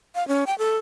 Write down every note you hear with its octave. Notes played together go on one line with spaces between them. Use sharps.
F5
C#4
G5
A4